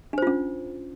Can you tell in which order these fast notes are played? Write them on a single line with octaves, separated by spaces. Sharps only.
D4 C5 F4 C#4